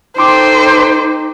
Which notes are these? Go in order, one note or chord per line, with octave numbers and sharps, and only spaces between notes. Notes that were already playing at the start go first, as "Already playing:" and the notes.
D#4 A4 C5 G5 C6 D6